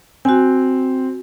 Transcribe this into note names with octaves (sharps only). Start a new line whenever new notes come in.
C4 F#4 G#5